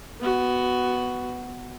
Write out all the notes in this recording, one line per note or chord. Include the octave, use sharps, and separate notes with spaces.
B3 F#4